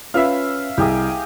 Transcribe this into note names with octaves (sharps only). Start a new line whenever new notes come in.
C#4 F4 B4 E5 F5
C2 G4 G#4 D#5